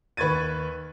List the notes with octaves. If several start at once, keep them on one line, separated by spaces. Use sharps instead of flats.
D#2 B4 C#6 G#6 A6 D#7